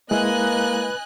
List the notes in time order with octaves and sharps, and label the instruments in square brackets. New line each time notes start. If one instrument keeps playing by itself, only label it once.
[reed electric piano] G#3 E4 [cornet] A#3 [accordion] B4 [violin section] D#5 G#5 F#6